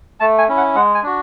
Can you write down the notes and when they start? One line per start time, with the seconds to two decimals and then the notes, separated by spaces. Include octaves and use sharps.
0.20 A3 A5
0.38 G#5
0.48 C#4 E4
0.57 F#5
0.75 G#3 F#5
0.95 G#5
1.03 D4 F#4